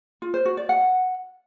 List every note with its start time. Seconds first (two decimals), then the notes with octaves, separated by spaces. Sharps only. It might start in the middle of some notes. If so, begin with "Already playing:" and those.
0.22 F4
0.34 C5
0.46 F#4
0.57 D5
0.69 F#5